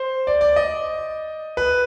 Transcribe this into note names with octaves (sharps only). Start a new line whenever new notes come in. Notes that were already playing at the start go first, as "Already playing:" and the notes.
Already playing: C5
D5
D5
D#5
B4